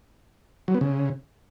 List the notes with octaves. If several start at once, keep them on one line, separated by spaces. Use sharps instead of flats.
F#3
B3
C#3